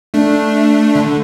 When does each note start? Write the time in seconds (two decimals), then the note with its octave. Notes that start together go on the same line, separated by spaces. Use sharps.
0.14 A3 D4
0.95 D3